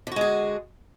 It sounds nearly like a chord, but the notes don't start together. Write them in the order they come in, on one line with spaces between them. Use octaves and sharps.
D3 F#4 G#3 G#4